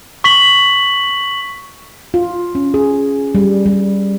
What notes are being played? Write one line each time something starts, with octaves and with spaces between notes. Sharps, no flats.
C#6 B6 F#7
F4
C#4
G#4
G3
G3